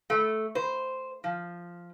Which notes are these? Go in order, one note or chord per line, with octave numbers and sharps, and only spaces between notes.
A3
C5
F3